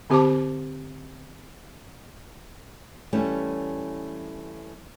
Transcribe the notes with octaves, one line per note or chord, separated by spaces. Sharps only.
D3 C4 G4 C5 A5 D6
E3 G3 A3 C#4